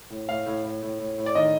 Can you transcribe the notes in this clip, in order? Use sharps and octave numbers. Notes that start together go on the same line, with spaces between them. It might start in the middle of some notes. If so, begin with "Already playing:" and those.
A2
A2 F5
A2
A2
A2
A2
A2
D5
D#3 D#5